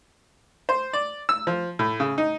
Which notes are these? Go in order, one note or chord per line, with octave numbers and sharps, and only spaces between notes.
C5
D5
E6
F3
A2
C#3
D#4